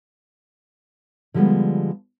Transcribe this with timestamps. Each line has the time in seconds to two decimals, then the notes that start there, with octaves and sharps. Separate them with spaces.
1.34 D3 F3 G3 G#3 B3